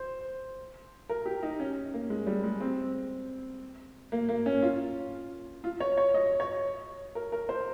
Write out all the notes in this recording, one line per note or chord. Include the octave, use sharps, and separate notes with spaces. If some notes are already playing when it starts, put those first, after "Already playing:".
Already playing: C5
A#4
G4
D#4
C#4
A#3
G#3
G3
G#3
C4
A#3
A#3
C#4
F4
F4
C#5
C#5
D#5
C#5
A#4
A#4
C5